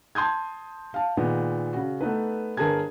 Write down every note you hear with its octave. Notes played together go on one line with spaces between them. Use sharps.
A5 C6 D#6 G6 G#6
F5 A5
A#2 D#3 G#3 B3
C#3 F#4
A3 B3 D#4 B4
G1 G#4 A#4 A5 G#6